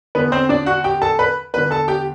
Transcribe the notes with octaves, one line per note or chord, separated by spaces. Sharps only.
E2 D3 B3 B4
C4 C5
D4 D5
F#4 F#5
G4 G5
A4 A5
B4 B5
E2 D3 B4 B5
A4 A5
G4 G5